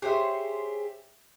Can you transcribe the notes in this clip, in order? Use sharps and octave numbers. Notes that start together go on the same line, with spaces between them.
G4 G#4 C5 C#5 E5